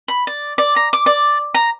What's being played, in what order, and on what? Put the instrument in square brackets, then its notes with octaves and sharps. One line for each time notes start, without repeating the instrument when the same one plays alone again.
[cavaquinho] B5
D5
D5
A#5
D6
D5
A#5